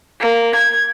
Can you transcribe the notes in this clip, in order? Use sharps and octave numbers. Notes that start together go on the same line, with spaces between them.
A#3
G#6